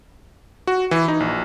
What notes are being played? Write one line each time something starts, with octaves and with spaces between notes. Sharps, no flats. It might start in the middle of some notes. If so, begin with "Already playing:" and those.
F#4
E3
D#4
A#1